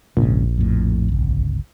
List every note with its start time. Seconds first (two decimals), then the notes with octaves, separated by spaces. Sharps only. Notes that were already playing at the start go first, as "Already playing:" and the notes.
0.17 F1 A#1 G#2 C#3
0.58 F2 A2
1.08 G1 C#2